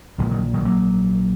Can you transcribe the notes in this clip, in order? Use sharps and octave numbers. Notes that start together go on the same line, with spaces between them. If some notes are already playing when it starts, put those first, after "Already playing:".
A#1 A#2 F3 G#3
D#3 F#3
D#3 F#3
F#3 A#3